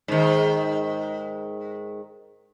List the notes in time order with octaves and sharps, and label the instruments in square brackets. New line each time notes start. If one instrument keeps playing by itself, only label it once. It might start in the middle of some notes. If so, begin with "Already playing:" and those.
[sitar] G#2 D#3